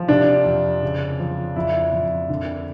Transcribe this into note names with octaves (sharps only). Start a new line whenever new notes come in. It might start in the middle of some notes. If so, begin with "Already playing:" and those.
Already playing: F3
C3 D4
F2
C#3
F3
F2 E4
F2
D3